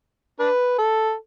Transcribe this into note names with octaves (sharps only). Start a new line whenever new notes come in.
D4 B4
A4